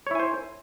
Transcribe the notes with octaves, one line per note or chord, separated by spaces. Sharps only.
E4 C5 C#5 G#5